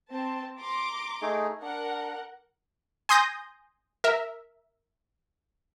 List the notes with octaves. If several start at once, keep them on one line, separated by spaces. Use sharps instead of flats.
C4 A5
A#5 C6 D6
A3 D#4 G#4
D4 A#4 F#5
G#5 C6 D#6 G6 A#6
A#4 E5